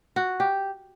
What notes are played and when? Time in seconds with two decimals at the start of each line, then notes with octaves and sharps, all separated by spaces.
0.16 F#4
0.40 G4